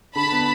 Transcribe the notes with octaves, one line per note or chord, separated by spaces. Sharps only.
D3 A5 B5
B3